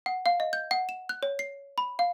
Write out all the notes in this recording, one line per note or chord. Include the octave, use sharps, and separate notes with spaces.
F#5
F5
D#5
G6
F#5
E7
F#6
C#5
C7
B5
F5